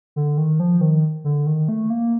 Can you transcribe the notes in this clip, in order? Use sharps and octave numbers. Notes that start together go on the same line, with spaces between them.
D3
D#3
F3
D#3
D3
D#3
A3
A#3